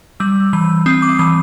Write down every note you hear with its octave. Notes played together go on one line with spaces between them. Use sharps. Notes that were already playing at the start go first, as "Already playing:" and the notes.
G3 E6
E3 E6
C4 D#6
D6
E3 D#6